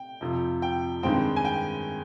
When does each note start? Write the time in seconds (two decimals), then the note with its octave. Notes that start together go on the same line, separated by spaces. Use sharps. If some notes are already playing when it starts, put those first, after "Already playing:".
Already playing: G5
0.21 F2 C3 F3
0.62 G5
1.03 G2 D#3 G#3 C4 G5
1.36 G#5
1.45 G5